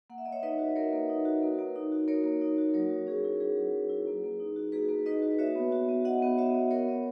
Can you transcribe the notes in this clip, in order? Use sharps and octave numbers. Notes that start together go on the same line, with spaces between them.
A#3 F#5
E5
A#3 D#5
C#5 E5
D#4 B4 D#5
F#4
A#3 A#4 C#5
A#3
D#4
F#4
A#3
A#3
D#4
F#4
A#3 A#4 C#5
A#3
D#4
F#4
F#3 A#4 C#5
F#3
C#4 G#4
E4
F#3 G#4 B4
F#3
C#4
E4
A#3
A#3
D#4
F#4
A#3 G#4 B4
A#3
D#4 B4 D#5
F#4
F#4 C#5 E5
B3
F#4
B3
F#4 D#5 F#5
B3
F#4 C#5 E5
B3
B3 A#4 C#5
B3